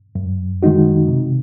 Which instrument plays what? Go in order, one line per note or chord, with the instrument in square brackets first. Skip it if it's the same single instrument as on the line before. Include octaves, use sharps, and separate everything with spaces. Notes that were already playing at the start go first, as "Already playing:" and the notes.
[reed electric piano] F#2
D#3 G#3 D#4 F#4
C3